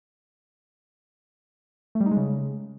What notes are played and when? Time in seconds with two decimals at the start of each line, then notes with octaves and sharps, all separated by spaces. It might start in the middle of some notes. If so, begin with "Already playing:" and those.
1.95 A3
2.01 G3
2.06 D#4
2.11 G#3
2.17 C#3